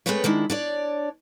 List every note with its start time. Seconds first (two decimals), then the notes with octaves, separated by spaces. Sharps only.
0.06 G#3 A3 C4 G#4 B4 C#5
0.24 D#3 G#3 D4 E4
0.50 D4 C#5 D5